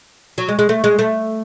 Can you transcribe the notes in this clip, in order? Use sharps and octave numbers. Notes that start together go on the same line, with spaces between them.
F#3
G#3
G#3
A3
G#3
A3